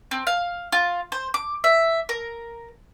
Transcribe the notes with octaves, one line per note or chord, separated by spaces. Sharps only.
C4
F5
F4
C5
D6
E5
A#4